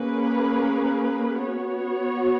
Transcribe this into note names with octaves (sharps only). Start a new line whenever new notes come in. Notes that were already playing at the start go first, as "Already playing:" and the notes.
Already playing: A#3 C#4 G#4 B4
B3 F#4 C#5